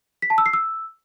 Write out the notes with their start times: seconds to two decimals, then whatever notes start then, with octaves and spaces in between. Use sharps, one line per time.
0.22 B6
0.30 A5
0.38 E6
0.46 C7
0.53 E6